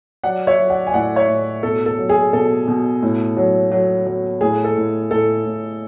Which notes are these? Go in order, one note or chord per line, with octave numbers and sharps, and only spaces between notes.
F#3 D5 F#5
C#5 E5
F#3
D5 F#5
G#5
A2 D5 F#5
C#5 E5
A2
B2 A4
A4
F#3
G#4
B2 A4
B2
A2
F#3
F#3
F#3
A2 G#4
A4
A2
A2 A4
A2